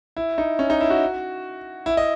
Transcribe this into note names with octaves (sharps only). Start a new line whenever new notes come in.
E4
D#4
C#4
D#4
E4
F#4
E4
D#5